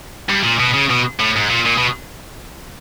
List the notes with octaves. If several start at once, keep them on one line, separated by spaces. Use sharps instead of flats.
G2
A#2
B2
C#3
B2
A2
G#2
A#2
A#2
B2